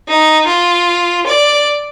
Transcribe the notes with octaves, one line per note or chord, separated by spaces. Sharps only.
D#4
F4
D5